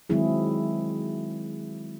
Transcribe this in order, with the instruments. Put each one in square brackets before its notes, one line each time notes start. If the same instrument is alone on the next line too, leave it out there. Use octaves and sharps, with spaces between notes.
[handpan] D#3 F#3 G#3 C4 E4 G#4